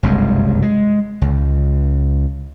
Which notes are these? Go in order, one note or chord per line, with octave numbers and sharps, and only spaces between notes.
F#1 C2 G2 G#3
G#3
C#2